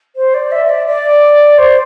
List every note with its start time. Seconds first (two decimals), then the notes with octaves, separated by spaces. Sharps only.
0.16 C5
0.34 D5
0.51 E5
0.65 E5
0.69 D5
0.87 D5
1.58 C5